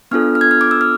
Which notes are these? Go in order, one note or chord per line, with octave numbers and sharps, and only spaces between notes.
B3 D4 F4 A4 F6
F6
G#6
F6
D6
E6
F6